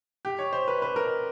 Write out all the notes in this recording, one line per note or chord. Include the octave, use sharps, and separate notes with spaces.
G4
C#5
C5
B4
B4
A#4